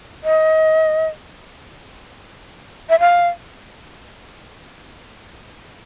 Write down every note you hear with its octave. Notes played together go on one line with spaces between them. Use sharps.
D#5
E5
F5